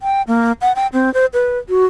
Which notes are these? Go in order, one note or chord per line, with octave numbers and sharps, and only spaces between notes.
G5
A#3
F#5
G5
C4
C5
B4
F#4